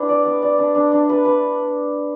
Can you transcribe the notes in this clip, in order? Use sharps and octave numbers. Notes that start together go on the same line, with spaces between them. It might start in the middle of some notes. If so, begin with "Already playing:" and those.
Already playing: G3 D4 E4 B4
D5
B3
D5
D4
D4
D4
B4
B4